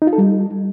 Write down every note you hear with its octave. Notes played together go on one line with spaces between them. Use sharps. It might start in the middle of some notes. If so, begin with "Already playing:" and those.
D#4
F4
A4
G3